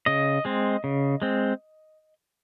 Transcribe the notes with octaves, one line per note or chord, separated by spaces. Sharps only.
C#3 D#5
G#3 C4
C#3
G#3 C4